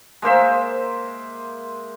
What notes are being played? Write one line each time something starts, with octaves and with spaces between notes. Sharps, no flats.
G#3 A#3 C5 E5